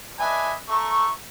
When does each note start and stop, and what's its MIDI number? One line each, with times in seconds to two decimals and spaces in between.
0.19 0.54 62
0.19 0.54 71
0.19 0.54 75
0.19 0.54 76
0.19 0.54 80
0.69 1.09 57
0.69 1.09 76
0.69 1.09 82
0.69 1.09 85